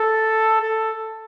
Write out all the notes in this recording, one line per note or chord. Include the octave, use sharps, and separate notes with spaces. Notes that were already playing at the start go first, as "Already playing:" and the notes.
Already playing: A4
A4